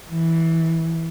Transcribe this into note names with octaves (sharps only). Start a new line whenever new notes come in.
E3